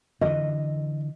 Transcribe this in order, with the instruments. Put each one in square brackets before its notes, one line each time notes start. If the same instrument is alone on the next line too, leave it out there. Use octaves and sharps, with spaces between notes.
[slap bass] D3 E3 [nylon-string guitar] D#5